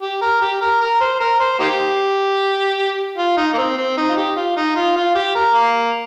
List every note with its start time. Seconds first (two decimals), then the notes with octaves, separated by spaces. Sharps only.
0.02 G4
0.22 A#4
0.41 G4
0.61 A#4
0.81 A#4
1.01 C5
1.20 A#4
1.40 C5
1.60 A#3 D#4 G4
3.17 F4
3.37 D#4
3.53 A#3
3.58 C4
3.77 C4
3.97 D#4
4.09 F4
4.16 G4
4.36 F4
4.57 D#4
4.75 F4
4.96 F4
5.15 G4
5.35 A#4
5.54 A#3